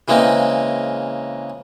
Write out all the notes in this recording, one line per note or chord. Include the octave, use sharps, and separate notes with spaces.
C#3 E3 G#3 A#3 C4